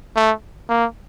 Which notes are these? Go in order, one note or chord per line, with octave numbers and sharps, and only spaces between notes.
A3
A#3